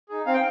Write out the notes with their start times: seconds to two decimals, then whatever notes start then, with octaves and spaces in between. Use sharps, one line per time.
0.09 D#4 G#4
0.26 C4 F5
0.34 G5